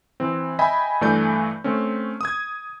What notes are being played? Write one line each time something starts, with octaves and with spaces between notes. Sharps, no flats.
E3 C4
D#5 E5 G5 G#5 B5
G2 E3 A3 D5 G#5 G6
A3 C4 C#4
D#6 G#6